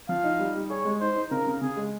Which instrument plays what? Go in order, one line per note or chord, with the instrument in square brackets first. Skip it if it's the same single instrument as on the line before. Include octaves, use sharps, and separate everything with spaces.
[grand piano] F3 [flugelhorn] F5
[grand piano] D#4
G3
G3
[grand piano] G#4 [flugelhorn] C#5
[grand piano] G#3
[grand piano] D#4 [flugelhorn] C5
[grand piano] D#4
[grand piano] C#3 [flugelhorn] A#4
[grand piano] C#3
[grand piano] C#3 [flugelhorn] G#4
[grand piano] G#3